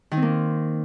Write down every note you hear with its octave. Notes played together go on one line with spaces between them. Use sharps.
D#3
C4
A#3